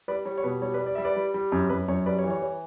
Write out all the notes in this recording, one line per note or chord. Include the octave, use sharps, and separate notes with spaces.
G3 B4 D5
G3 C#5
C#5
B2 B4
G3 C#5
B4 D5
G3
D5
G3 E5
B4 D5
G3
G3
F#2
F#2 B4
F#2 C#5
G3 B4 D5
C#5
E3
C#5
C#5